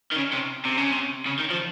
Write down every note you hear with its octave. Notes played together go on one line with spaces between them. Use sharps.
D#3
C#3
C3
C3
C#3
C3
C#3
D#3
F3